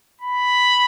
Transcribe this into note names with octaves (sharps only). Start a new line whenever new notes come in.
B5